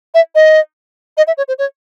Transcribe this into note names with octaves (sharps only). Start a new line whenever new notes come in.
E5
D#5
D#5
E5
C#5
C5
C#5